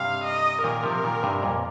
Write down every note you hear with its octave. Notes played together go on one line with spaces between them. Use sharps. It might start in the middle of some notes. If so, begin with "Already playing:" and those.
Already playing: G2 C3 F5
D#5
A#2 D#3 A#4
C3 F3
A#2 D#3
G2 C3
F2 A#2